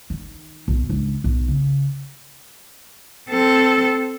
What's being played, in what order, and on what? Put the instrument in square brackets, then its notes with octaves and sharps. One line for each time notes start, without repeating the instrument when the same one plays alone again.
[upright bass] D#3
B1
C#2 D4
B1
C#3
[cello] C4 A4